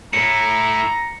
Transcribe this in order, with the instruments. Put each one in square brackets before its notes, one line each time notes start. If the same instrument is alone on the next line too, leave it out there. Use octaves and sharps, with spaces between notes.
[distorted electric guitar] A2 E4 [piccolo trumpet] A#5 [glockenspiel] C#7